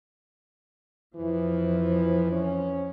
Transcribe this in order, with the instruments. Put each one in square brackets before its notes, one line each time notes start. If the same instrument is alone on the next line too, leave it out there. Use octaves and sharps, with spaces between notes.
[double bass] F2 F3 [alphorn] E3
[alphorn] C#4